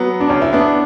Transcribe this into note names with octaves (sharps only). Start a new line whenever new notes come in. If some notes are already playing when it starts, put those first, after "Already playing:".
Already playing: F#3 B3
D4
C#2 C#4
E4
B3 D4